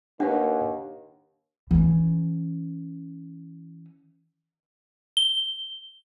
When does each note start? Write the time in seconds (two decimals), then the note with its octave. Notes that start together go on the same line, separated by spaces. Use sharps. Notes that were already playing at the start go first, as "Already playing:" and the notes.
0.20 D#2 D4 G4 A#4 B4 F#5
1.71 E3 C#4
5.17 G7